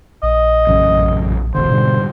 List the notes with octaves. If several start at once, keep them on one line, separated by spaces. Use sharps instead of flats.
A#1 D#5
A1 F#2 C#3
E1 A1 D3 C5
G#2 B2 D3 G3